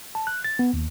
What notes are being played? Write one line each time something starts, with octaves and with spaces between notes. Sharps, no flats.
A5
F#6
A6
B3
D#2